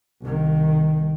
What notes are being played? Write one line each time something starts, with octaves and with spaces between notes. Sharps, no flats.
C2 D#3